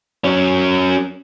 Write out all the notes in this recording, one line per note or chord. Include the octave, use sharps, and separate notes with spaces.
F#3 C#4